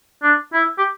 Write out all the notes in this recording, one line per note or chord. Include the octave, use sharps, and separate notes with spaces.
D4
E4
G4